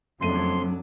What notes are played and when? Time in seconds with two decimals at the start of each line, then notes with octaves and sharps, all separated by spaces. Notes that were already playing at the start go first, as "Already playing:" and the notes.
0.21 F#1 F2 F#3 A3 D4 C6 D#7